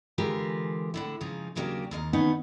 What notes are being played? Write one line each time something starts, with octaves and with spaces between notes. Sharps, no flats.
D3 E3 G#3 F4 G4 A#4
A2 D3 E4
G#2 C#3 F3 D#4
D#2 C#3 F#3 A#3 D4 G4
D#2 A#3 D#5
D#3 B3 C#4 D#4